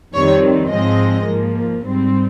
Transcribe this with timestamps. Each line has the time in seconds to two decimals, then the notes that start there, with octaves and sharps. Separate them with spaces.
0.15 F2 D#3 G3 C4 C#5
0.71 G#2 F3 G#3 C4 D#5
1.26 G#2 F3 A#3
1.82 G#2 G3 C4